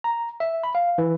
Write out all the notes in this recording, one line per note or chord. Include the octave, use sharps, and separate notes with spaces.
A#5
E5
B5
F5
E3